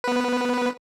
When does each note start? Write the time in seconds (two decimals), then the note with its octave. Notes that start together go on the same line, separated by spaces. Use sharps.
0.04 B3 B4